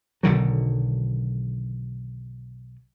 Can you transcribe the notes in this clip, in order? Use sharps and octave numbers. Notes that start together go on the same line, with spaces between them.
B1 D3 D#3 F#3